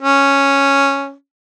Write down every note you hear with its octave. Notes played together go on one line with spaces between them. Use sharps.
C#4